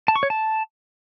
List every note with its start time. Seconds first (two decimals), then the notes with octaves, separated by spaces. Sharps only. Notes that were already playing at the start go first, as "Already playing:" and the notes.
0.08 A5
0.16 C#6
0.23 C#5
0.30 A5